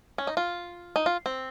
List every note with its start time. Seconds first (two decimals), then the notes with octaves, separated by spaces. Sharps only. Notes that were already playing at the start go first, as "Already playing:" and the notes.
0.18 C#4
0.27 D#4
0.37 F4
0.96 D#4
1.06 F4
1.26 C4